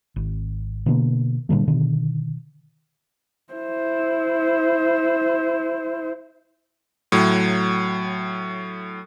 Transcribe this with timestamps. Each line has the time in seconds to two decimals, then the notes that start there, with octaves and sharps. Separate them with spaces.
0.16 G#1
0.86 B2 D3 A#3
1.49 A#2 D3 G3 A3
1.67 B2 D3 D#3
3.53 E4 C5
7.12 A2 F#3